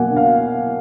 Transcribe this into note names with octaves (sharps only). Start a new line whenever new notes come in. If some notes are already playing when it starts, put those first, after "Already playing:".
Already playing: B2 F#3 A#3 F#5 G#5
D4
F5